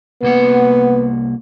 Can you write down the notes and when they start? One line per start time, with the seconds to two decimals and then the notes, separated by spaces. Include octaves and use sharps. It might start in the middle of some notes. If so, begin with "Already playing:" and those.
0.23 C2 A#3 B3 F#5